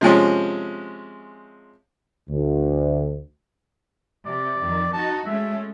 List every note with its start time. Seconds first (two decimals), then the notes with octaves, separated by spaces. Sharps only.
0.01 C3 F3 G#3 C#4
2.29 D2
4.26 C3 D5
4.61 F2 D#3
4.93 D#4 F#4 A5
5.26 G#3 A3 C#4 E5